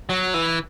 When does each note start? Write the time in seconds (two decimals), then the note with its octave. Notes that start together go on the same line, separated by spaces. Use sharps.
0.09 F#3
0.34 E3